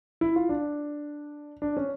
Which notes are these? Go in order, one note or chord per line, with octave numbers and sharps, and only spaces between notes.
E4
F4
D4
D4
C#4